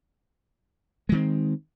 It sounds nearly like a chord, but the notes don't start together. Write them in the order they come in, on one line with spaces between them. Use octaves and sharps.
G#3 D#3 C4